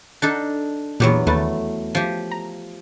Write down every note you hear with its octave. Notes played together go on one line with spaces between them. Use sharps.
D4 D#4 A4 F#5
E2 A#2 F#3 B3 G4
D#2 A3 B4 A6
F3 G4
A#5